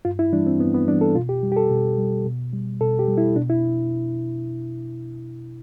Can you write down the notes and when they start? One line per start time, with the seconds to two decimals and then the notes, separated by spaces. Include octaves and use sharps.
0.05 G2 F4
0.19 E4
0.33 E3 G3 D4
0.47 C4
0.60 G2 B3
0.74 B3
0.88 G3 D4
0.92 E3
1.01 A4
1.15 B2 F4
1.29 G4
1.43 G3
1.52 G4
1.56 A4
1.70 B2
1.98 G3
2.26 B2
2.53 G3
2.81 B2 A4
2.99 G4
3.08 G3
3.18 E4
3.36 B2 D4
3.50 E4